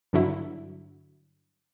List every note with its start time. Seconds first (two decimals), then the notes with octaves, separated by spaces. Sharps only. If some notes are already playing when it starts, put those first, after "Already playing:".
0.13 G2 D3 F#3 E4